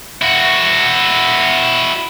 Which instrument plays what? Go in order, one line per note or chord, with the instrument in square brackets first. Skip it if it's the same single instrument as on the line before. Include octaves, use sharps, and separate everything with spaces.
[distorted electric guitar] E4 F#4